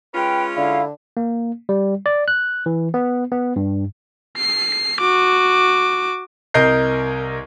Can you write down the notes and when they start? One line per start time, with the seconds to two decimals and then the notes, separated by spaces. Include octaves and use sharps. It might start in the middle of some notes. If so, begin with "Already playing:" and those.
0.15 G#3 C#4 F4 B4 G5
0.56 D3 E4 F5
1.17 A#3
1.69 G3
2.06 D5
2.28 F#6
2.66 E3
2.94 B3
3.32 B3
3.56 G2
4.38 C7
5.00 F#4 D6
6.54 C2 A#4 D#5 G6 C7